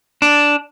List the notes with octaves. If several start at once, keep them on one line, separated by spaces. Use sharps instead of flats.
D4